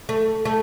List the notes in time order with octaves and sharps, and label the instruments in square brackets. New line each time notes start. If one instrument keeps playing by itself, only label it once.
[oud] A3
A3